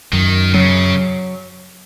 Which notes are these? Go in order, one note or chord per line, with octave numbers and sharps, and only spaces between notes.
F#2 D#3
C#3 F#3